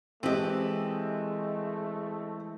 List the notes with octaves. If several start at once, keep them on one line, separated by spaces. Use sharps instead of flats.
E3 G#3 A3 C4 G4 D#5